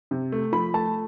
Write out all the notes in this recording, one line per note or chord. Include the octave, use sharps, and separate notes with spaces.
C3
A3
F3 B5
A3 A5